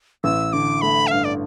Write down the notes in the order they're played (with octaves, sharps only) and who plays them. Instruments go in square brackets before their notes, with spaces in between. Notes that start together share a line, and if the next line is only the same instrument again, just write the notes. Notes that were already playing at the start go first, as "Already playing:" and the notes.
[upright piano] A1 [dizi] E6
[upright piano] D3 [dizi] D6
[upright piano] A3 [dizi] B5
[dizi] E5
[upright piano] G2 [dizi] F5
[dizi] D5